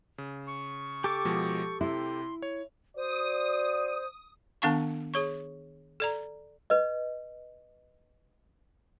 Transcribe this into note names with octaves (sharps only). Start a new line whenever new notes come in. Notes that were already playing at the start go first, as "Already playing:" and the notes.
C#3
C#6
G4 A4 D6
B2 F3 G#3
C3 E4 C6
C#5
F#4 C5 D5 D#6
D#3 B3 D4 F5 A5 C#6
G#4 C#5 C#6
A4 D5 A#5
B4 D#5